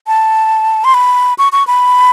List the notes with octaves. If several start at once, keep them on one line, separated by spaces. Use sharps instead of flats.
A5
C6
B5
C#6
C#6
B5